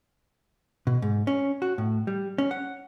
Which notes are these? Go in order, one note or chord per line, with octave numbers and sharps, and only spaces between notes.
B2
G#2
C#4
F#4
A2
G3
C#4
F#5